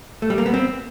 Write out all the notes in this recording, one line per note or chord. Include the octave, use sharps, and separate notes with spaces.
A3
G3
A#3
B3
C4